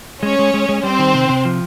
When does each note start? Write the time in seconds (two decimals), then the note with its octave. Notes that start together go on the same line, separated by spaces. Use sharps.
0.23 G#3 C#4 C#5
0.39 G#3
0.54 G#3
0.69 G#3
0.84 G3 C4 C5
0.99 D#3
1.14 C3
1.29 C3
1.45 F3